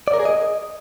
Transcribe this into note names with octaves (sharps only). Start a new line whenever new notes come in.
D5
A#4
G#4
D#5